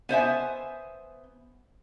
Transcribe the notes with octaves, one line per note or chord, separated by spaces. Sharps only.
B3 C5 E5 G#5